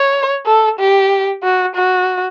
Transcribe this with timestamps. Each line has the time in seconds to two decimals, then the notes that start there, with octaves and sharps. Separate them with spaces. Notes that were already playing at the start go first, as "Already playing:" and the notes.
Already playing: C#5
0.46 A4
0.79 G4
1.43 F#4
1.76 F#4